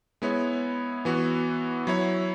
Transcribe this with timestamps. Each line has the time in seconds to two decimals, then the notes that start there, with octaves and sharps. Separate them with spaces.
0.22 G#3 B3 E4 C#5
1.05 E3 B3 F#4
1.87 F#3 E4 C#5